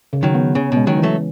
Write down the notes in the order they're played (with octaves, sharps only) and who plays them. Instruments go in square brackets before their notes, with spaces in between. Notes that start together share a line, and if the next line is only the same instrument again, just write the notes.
[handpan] C#3
[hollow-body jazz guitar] D#3 F#3
[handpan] B3
[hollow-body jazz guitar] C#3 [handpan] C#4
[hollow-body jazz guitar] B2 [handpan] G#3
[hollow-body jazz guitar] D#3 F#3
[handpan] E3
[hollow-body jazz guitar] F#3 A3